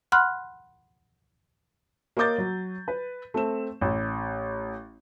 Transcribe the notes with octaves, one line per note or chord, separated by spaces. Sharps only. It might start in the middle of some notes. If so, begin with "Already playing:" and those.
F#5 B5 C6 F6 F#6
A#3 C#5 D#5 D6 G6 A6
F#3
B4
A3 C4 E7
A1